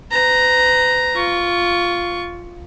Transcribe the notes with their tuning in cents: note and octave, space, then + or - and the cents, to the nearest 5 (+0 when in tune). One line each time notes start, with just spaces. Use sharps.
B4 +40 A#5 +0
F4 +0 C#6 +15